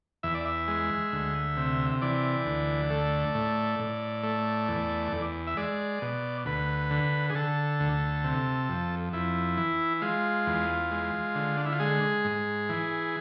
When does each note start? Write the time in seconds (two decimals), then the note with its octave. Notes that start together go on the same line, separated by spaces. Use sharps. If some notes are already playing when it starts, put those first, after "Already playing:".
0.23 E2 E5
0.34 D5
0.45 E5
0.68 G#3
1.12 D2
1.57 C3
2.02 E3 D5
2.45 D2
2.90 A3
3.35 A2
3.79 A2
4.23 A3
4.68 E2
5.12 E2
5.47 E5
5.57 G#3 D5
6.02 B2
6.46 D2 B4
6.91 D3
7.30 G#4
7.34 D3 A4
7.80 D2
8.24 C3
8.69 F2
9.13 F2 E4
9.57 E3
10.02 G#3 F4
10.46 E2
10.91 G#3
11.35 D3
11.57 D4
11.66 E4
11.72 F4
11.80 G#3 G#4
12.25 G#2
12.69 E3